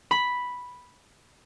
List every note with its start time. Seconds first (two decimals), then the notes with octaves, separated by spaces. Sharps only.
0.11 B5